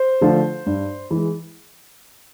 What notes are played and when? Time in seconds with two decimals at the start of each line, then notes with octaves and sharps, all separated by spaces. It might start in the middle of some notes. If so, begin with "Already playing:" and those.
Already playing: C5
0.21 D3 F3 A3
0.66 G2
1.11 E3
1.16 G#3